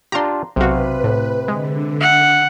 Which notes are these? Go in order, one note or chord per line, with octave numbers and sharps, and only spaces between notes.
D4 F4 G4 A#5 C6
B1 C3 F#4 B4 F5
A2
D3 G#3
E5 F#5